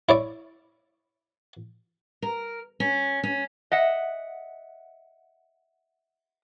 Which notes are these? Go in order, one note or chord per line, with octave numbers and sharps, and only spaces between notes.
E4 C#5 D5
A#4
C#4
C#4
D#5 E5 F#5